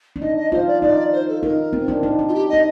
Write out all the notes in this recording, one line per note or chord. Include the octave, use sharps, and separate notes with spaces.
D4
D#4 D#5
D#5
F4 C5
D5
D#4 D5
C5
A4
D#4 A#4
C4
D4
D#4
D#4
F4
G4
D#4 D#5